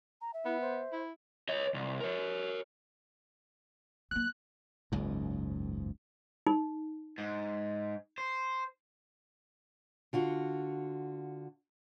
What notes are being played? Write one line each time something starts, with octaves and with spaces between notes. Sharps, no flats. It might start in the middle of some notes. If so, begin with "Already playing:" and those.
A#5
E5
B3 E4
C5
E4
C#5 D#5
C2
A#4 C#5
F#3 A#3 F#6
F#1 C#2 G#2
D#4
G#2
C5
D3 F4 F#4